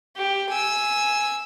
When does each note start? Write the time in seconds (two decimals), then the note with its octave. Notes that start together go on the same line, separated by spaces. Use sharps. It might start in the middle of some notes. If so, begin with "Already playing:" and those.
0.16 G4
0.50 G#5 E6